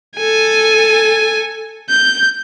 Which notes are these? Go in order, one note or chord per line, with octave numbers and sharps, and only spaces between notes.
A4 G#5
G6